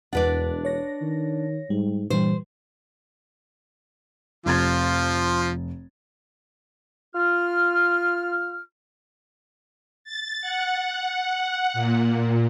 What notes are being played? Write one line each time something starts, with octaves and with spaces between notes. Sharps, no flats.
E1 E2 D4 B4 D5 F#5
C#5 A#6
D#3
G#2 G3
G2 A#2 E3 G3 C5
F1 F3 F4 G#6 A6
F4 F6
A6
F#5
A#2